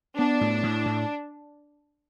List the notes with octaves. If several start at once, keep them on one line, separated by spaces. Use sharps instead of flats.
B3 D4
A2
A2
A2